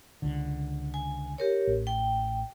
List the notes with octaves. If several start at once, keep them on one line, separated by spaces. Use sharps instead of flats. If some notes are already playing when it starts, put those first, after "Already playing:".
C#2 D3
G#5
G4 A#4 C#5
A1
G5